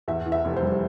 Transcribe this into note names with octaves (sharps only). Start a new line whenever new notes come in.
E2 E5
E3
E5
F1
C5
G3